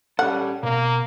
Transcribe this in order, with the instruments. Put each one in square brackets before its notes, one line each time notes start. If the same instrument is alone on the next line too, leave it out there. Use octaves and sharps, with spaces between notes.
[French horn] G3 [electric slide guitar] C#4 A4 [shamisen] F#5
[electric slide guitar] B2 [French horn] A#3